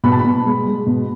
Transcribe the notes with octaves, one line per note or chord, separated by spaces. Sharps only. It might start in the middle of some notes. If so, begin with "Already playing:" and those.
B2 B5
A5
B5
B2
G#3
G#3
B2